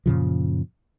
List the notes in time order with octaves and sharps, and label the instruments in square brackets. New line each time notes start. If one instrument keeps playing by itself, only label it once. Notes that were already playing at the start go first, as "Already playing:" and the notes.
[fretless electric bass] F#2 A#2 C#3 F3